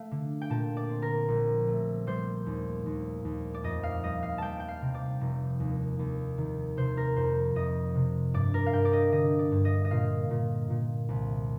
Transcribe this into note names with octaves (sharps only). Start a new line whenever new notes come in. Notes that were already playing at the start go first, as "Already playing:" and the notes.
Already playing: A3 F5
D3
G5
A#2 A5
D5
C4
A#4
A#1
A3
G3 C5
D#2
D#2
D#2
D5
F2 D#5
F5
G3 D#5
F5
G3 G5 A5
G5
F5
C3
D5
F1
D#2
D#2
D#3
C3 C5
A#4
F2 C5
F2 D#5
C3
G2 D5
A#4
F5
G2 G5
D5
D#5
D3 D#5
D5
G2
D#5
D#5
A#2 F5
A#2
A#2
C2